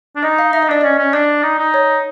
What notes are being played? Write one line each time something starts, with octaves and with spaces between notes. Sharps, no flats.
D4
D#4 D#5
F5
D#4 E5
D#5
D4 D5
C#4 D#5
C#4
D4 D5
D#4
D#4
C#5